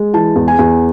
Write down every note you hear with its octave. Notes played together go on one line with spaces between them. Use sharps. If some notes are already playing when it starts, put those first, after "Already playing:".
Already playing: G#3
E3 A5
E2
G#5
E2